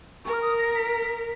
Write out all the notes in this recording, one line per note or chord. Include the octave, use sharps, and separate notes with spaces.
A#4 C#6
F6
D#6
A#6
B6